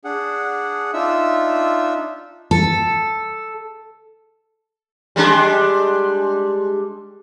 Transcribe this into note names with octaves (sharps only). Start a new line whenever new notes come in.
D4 G#4 F#5
D4 D#4 F4 E5 E6
A4
G3 G#3 D4